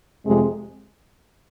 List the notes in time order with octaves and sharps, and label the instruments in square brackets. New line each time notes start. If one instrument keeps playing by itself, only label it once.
[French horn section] F2 C3 G#3